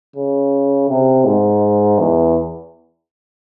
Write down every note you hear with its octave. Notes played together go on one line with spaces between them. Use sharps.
C#3
C3
G#2
E2